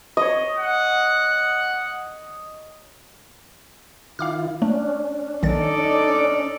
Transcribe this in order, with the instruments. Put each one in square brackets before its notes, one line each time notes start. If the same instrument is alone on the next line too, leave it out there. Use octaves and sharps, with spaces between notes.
[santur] C#5 D#5
[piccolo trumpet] F#5
[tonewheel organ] D#3 E4 F4 [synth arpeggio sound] F5 D6 F6
[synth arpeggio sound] A3 [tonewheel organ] C#4 D4
[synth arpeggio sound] A#1 D#3 A6 [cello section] D#4 A4 D5